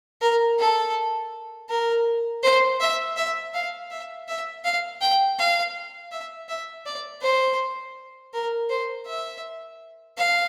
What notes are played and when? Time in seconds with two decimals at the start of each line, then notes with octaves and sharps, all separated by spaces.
0.22 A#4
0.59 A4
1.70 A#4
2.43 C5
2.81 E5
3.17 E5
3.54 F5
3.91 E5
4.28 E5
4.64 F5
5.02 G5
5.39 F5
6.11 E5
6.49 E5
6.86 D5
7.22 C5
8.34 A#4
8.70 C5
9.07 E5
10.17 F5